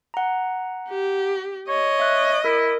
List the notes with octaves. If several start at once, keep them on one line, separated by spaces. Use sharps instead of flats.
F#5 A#5
G4
C#5 D#5
E5 F#6
E4 A#4